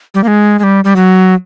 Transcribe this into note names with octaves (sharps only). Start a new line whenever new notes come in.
G3
A#3
G#3
G#3
G3
G3
F#3